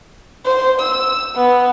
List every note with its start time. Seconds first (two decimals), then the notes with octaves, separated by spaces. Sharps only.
0.45 C5
0.81 E6
1.36 B3